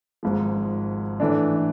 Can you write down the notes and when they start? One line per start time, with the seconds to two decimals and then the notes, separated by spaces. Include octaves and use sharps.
0.23 G#1 G#2 F3
1.20 A2 E3 A3 D4